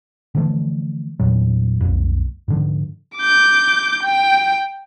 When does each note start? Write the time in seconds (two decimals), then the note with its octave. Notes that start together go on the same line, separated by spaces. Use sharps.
0.35 D3 E3 F3 A3
1.20 E2 A#2 F#3
1.81 B1 F2
2.48 G#2 D3 F3
3.18 D6 G6
4.03 G5